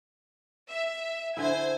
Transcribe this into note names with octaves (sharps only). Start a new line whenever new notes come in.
E5
D3 E4 C5 G#5 G#6